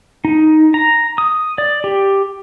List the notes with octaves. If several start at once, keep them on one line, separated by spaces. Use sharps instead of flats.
D#4
A#5
D#6
D5
G4